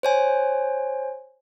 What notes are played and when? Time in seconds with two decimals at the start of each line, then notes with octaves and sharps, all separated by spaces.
0.03 C5 C#5 G#5